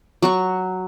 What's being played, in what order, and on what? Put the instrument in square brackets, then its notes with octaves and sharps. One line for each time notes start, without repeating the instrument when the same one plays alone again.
[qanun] F#3 F#4 C#6